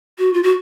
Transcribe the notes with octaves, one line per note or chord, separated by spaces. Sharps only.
F#4
F4
F#4